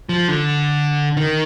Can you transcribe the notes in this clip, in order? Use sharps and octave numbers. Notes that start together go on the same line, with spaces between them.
F3
D3
D#3